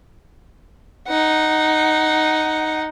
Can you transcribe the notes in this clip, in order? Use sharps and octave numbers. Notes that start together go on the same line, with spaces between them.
D#4 F#5